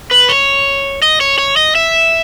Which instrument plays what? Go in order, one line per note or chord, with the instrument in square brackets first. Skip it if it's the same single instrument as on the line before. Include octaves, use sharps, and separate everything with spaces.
[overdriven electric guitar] B4
C#5
D#5
C#5
C#5
D#5
E5